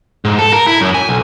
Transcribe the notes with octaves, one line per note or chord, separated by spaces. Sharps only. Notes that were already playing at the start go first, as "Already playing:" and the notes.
G#2
A4
A#4
E4
F#2
G#5
B1